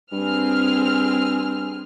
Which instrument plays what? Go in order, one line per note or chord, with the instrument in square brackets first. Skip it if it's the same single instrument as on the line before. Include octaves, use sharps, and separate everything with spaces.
[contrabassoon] G2 [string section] C4 G#4 F6